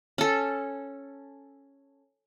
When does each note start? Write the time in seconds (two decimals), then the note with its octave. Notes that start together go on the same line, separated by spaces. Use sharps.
0.18 C#4 A4